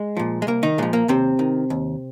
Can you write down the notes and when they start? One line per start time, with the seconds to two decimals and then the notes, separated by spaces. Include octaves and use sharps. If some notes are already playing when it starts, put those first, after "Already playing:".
Already playing: G#3
0.17 A#2 F3
0.42 G#3
0.47 C2 A#3
0.63 D#3 D#4
0.78 A#2 F3 G#3
0.93 A#3
1.08 D#2 C3 C4
1.39 D#3
1.70 D#2